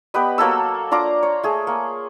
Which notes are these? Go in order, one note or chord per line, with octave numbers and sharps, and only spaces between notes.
B3 G4 B4 D#5
F#3 A#3 A4 E6
D4 F4 A#5 D6
C#5
A3 G#4
A#3